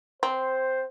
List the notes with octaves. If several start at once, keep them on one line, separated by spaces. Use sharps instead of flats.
C4 C5